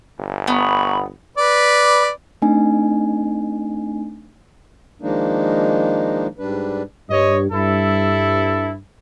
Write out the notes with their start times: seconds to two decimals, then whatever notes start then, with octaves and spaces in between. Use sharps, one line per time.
0.19 G1
0.47 B3 A#5 B5 C#6
1.37 B4 D5
2.42 A3 C4 D4 D#4 G#5
5.02 D#3 F3 G#3 A#3 D4 D#4
6.39 G#2 G3 D4 B4
7.09 G2 C#5 D#5
7.51 G2 E4 A4